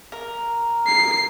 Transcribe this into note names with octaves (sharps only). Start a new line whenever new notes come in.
A#4
C7